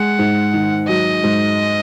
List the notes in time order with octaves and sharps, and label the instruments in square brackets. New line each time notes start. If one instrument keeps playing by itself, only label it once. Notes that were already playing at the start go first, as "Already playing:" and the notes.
Already playing: [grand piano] G#3 [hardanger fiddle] F#5
[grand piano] G#2
D#3
[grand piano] F#3 [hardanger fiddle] D#5
[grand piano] G#2